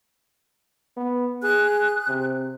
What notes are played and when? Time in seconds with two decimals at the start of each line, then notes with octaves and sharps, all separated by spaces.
0.97 B3
1.43 G#4 F#6
2.08 C3